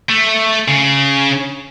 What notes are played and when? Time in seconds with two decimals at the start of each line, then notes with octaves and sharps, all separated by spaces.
0.09 A3
0.68 C#3